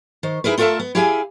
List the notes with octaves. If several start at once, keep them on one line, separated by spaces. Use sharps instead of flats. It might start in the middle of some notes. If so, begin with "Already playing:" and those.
D#3 C5
D#4 E4 G#4 A#4 B4
A3 F4 A4 A#4 E5 A5
B3
E4 G4 G#4 E5 F5 G#5